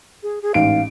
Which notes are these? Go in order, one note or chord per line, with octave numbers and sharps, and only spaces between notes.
G#4
G#4
A1 G#2 F5 D7